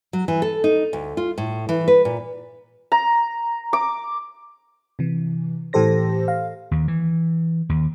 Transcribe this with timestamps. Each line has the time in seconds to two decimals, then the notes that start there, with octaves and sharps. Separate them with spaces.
0.13 F#3
0.28 E3
0.42 A4
0.64 D#4
0.93 D2
1.17 F4
1.38 A2
1.69 E3
1.88 B4
2.05 A#2
2.92 A#5
3.73 D6
4.99 C3 E3
5.73 A2 E3 G4 A4 C5 A#6
6.28 F5
6.71 D#2
6.88 E3
7.69 D#2